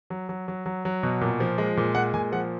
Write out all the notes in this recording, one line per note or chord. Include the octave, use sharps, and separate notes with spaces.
F#3
F#3
F#3
F#3
F#3
B2
A#2
F3
G#3
A#2
G#3 F#5
A#2 G#5
F3 F#5